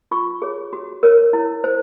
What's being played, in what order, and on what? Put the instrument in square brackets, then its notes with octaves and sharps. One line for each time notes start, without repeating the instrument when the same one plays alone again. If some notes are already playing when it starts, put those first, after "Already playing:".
[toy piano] F4 C#6
G#4 C#5
F#4
A#4 C#5
E4
C5